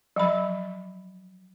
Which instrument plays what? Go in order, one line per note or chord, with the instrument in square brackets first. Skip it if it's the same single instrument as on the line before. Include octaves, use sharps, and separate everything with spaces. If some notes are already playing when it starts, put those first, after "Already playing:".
[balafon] F3 F#3 B5